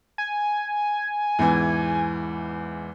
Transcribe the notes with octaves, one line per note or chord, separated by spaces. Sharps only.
G#5
E2 G#2 E3